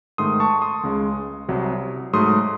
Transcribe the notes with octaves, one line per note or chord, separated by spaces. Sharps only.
G#2 D#3 A3 C6 D#6
A5 C#6
C6 D#6
C#2 C#3 G#3
C2 C3 F#3
G#2 F#3 A3 C6 D#6